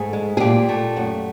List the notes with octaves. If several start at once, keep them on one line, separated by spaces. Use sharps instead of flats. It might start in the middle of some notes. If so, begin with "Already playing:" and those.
Already playing: G#2 A3 G#4
G#3
G#4
A#2 G4
A3
F#2